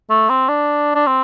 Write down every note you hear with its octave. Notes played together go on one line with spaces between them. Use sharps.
A3
C4
D4
D4
C4